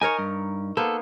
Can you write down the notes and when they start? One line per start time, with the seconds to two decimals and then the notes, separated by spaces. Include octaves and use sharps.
0.01 D#4 A#4 C#5 G#5
0.19 G2
0.77 A#3 B3 A4 C5